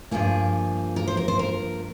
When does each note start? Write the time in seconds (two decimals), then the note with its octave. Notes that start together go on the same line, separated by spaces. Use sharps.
0.11 G2 F3 A#3 G#4
0.96 A#4
1.07 C5
1.17 A#4
1.28 C5
1.39 A#4